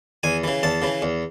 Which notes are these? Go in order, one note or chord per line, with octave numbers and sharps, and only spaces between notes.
E2 G#5
C#3 E3
E2 A5
C#3 E3
E2